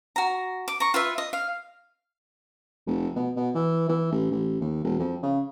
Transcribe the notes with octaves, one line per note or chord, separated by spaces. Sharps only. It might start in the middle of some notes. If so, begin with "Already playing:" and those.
F#4 A#5
D6
A#5 C#6
F4 B4 E5
D#5
F5
F1
B2
B2
E3
E3
A1
A1
D#2
E1
F2
C#3